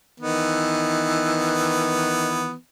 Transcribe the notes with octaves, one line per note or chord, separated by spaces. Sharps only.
D#3 E3 B3